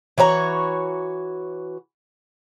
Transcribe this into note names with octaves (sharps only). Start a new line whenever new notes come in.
E3 F#4 C#5 A#5